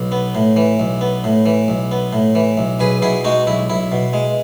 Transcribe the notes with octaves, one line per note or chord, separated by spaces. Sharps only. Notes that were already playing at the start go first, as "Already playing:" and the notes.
Already playing: B1
B3
A2
E3
B1
B3
A2
E3
B1
B3
A2
E3
B1
B1 G#4 B4
B2 E4 G#4
G#3 D#4 F#4
B1 E4
B1 E4
B2
G#3